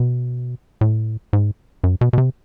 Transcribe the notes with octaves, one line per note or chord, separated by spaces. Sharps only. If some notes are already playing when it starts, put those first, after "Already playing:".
Already playing: B2
A2
G#2
F#2
B2
B2
C3